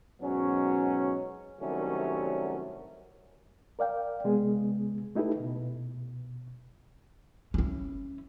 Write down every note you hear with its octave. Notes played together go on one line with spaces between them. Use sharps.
G#2 B2 F#3 C#4
C2 D#3 F#3 G3 A3 C#4
A#4 D5 F5 G5
C3 G#3 B3 G#4
A3 D#4 E4 G4 A4 B4
B2
C#4 E4